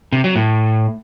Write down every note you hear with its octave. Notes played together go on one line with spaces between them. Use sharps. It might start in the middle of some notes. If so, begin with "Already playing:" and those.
C3
F#3
A2